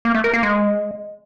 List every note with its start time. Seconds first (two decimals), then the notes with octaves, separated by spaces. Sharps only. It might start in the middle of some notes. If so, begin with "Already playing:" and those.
0.05 A#3
0.15 A3
0.24 A#4
0.34 A#3
0.43 G#3